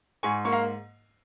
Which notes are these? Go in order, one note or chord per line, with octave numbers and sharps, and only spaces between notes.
G#2 G#5 C#6
A#3 C#6
F5 A#5